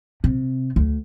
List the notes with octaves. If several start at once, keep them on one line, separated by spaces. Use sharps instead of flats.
C3
D2